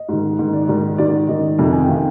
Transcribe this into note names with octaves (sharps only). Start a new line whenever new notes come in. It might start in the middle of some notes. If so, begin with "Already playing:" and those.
Already playing: D#5
G#2 D#3
G#2 D#3
D5
G#2 D#3 D5
G#2 D#3 D5
G#2 D#3 D#5
F2 C3 D#3
G#5
G5
C3 D#3 F5